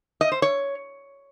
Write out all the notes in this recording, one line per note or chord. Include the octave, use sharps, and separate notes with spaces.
D#5
C5
C#5